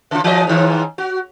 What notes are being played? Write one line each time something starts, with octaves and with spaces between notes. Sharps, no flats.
C#3 F4
E3 D#5
G#2 D#3
F#4